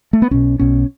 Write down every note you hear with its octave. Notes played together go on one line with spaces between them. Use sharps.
A3
B3
B1 B2 C#4
B1 B2 C#4